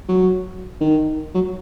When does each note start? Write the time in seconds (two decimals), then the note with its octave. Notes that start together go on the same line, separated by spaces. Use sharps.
0.09 F#3
0.81 D#3
1.34 F#3